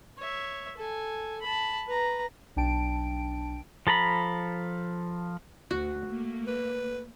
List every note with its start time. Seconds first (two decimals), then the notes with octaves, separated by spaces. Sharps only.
0.18 C#5 E5
0.77 A4 G#5
1.42 A5 B5
1.87 B4 A#5
2.56 B1 D4 G5 A5 D7
3.87 F3 A4 A#5 B5
5.71 D2 F#4
6.07 A3 A#3
6.47 B4